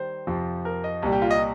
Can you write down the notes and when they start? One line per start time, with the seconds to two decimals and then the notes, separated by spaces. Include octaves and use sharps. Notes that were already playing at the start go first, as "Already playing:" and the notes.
Already playing: D#3 G3 C5
0.27 F2 C3 F3
0.65 A#4
0.84 D#5
1.02 C2 A#2 G3
1.12 G4
1.22 F4
1.31 D#5